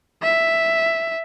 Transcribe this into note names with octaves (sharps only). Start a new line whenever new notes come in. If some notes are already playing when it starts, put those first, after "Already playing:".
E5